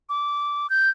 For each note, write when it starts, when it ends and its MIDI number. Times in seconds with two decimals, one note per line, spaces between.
0.09 0.69 86
0.70 0.90 91